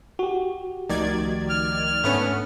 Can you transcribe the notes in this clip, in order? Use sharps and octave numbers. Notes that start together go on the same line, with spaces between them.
F#4 G4
C#2 D#3 F3 A3 D5 G#6
F6
G#2 A3 B3 C#4 D4